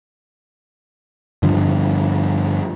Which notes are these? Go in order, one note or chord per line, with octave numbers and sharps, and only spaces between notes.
G2 D3 F3